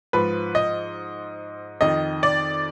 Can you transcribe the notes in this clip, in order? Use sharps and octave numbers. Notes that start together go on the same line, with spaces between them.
G#2 F3 B4
D#5
F2 D#3 D#5
D5